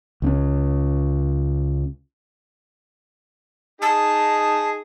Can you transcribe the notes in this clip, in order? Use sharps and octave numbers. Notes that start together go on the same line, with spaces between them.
C#2 C4 C#4
D#4 G#4 A5